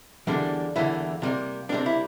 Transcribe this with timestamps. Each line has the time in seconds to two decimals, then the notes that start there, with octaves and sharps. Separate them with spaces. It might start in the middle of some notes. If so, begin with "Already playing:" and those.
0.27 E2 D3 G3 A#3 D4
0.76 E2 D3 G3 A#3 E4
1.22 C3 G3 A#3
1.69 C3 G3 A#3 D4
1.86 E4